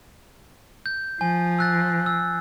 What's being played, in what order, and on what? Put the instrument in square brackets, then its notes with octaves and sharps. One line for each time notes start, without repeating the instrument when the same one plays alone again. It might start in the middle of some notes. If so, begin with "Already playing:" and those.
[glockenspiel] G6
[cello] F3 [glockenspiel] G#5
[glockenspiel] E6 F#6 A6
E6